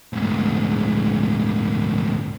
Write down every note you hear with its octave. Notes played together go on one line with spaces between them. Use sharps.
D2 G#2